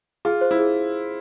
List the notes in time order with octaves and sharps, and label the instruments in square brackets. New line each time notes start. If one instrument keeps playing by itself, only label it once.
[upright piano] F4 [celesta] G#4
[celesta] C5
[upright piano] E4
[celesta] G#4